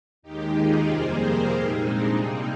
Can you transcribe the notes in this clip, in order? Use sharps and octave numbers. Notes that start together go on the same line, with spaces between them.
D#2 D#3 G#3 D#4 G4
F4 G#4
F2 C3 G3 A#3 G#4 C5
G4 A#4
A#2 G#3 C4 D#4
D4
C3 G3 A#3 C4 D#4